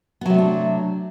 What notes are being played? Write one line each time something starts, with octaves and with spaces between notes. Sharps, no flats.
C3 F#3 A3 B3 D4